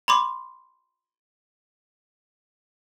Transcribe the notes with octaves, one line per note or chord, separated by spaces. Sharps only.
B5 C6 D6